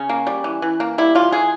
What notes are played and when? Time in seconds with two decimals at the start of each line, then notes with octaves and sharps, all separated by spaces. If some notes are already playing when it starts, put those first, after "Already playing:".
Already playing: C#3 C#4
0.09 A#3
0.27 G3
0.44 E3
0.62 E3
0.80 A#3
0.98 G3 E4
1.15 E3 F4
1.32 E3 G#4